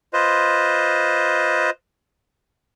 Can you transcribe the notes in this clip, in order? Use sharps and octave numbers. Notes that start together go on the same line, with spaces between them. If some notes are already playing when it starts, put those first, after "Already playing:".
F4 B4 C5 D#5